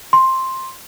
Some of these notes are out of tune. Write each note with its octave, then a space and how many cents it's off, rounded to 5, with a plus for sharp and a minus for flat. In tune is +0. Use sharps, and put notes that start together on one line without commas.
C6 +5